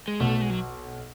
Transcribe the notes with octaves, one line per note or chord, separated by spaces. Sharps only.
G#3
B1 B2 A3
G#3
F#3